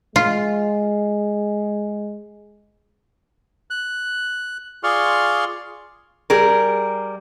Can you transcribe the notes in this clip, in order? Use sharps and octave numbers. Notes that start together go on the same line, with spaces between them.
G#3 F4
F#6
F4 G#4 D5 C6 C#6 F6
G3 G#4 A#4